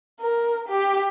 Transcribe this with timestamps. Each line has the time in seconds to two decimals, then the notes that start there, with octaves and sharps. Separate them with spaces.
0.20 A#4
0.68 G4